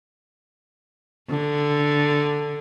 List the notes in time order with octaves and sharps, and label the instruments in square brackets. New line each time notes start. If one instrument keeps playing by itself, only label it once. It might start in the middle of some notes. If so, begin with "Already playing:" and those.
[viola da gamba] D3